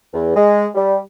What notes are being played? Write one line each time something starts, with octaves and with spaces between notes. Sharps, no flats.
E2
G#3
G3